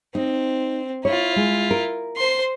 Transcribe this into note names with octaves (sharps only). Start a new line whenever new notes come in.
C4 D#4
E4 F4 C#5
G#3
A#4
C5 C6